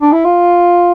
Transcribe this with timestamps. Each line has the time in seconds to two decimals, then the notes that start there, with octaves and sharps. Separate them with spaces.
0.02 D4
0.13 E4
0.25 F4